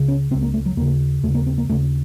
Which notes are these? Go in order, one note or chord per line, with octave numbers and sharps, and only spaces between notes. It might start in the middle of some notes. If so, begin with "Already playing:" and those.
Already playing: C#2 C#3
C#4
C#2 C#3 C4
A#3
A3
F#3
D#2 C#3 A#3
D#2 C#3 A3
A#3
C4
A#3
D#2 C#3 A3